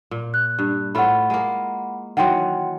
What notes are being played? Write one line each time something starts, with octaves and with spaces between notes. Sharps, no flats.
A#2
F#6
G2
A2 A3 F4 F#5 B5
G#3 A#3
D#3 E3 F#3 F#5 G5 C6